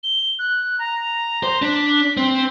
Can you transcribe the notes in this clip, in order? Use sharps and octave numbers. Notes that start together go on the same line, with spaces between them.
G7
F#6
A#5
C5
D4 B6
C4